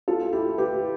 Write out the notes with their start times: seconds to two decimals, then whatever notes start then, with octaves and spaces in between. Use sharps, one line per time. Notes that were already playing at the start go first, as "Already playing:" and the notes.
0.08 F4 A4
0.33 E4 G4
0.58 G4 B4